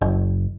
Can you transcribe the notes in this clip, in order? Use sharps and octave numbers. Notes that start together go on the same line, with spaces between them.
F#1